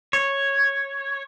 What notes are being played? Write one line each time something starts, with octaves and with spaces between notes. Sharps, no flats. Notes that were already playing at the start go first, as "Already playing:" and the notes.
C#5